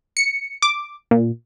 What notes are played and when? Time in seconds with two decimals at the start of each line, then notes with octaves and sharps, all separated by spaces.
0.17 C#7
0.62 D6
1.11 A#2